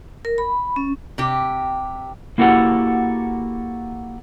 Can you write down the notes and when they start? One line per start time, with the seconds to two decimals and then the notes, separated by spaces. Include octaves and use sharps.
0.25 A#4
0.38 B5
0.76 C#4
1.18 C3 G4
2.38 A#3 E4 F#4 G4 A4 F#5